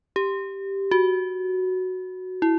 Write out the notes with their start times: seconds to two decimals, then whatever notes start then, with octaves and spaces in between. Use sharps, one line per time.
0.16 G4
0.91 F#4
2.42 E4